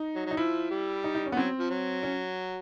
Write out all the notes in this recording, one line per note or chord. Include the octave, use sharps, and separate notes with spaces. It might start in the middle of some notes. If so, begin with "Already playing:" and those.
Already playing: D#4
F#3
F#3 D#4
F3 E4
G3
D#4
D#4
C#4
B3
F#3 C4
F3
F#3
C#4